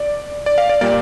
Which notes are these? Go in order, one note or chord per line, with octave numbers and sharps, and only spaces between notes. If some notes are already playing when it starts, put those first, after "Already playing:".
Already playing: D5
D5
F5
D5
A#2 G3 A#3 D5